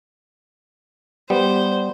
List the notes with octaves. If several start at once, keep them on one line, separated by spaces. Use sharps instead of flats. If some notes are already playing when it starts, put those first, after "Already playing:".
G3 B3 C5